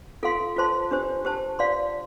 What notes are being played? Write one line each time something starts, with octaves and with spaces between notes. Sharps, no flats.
F4 A4 F5 C6
F4 C5 A5 C6
D4 G4 C5
G4 C5 A5
F4 D5 F5 C6